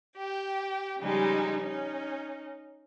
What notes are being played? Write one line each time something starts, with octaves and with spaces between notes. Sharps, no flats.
G4 G5
C#3 F3 G3 G#3 D#4
C#4 D#4